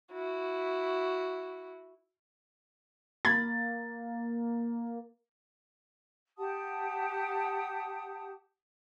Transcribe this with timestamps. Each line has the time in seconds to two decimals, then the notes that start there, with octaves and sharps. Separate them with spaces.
0.12 E4 F#4
3.25 A#3 B5 G#6 A6
6.38 G4 F#5 A5 D#6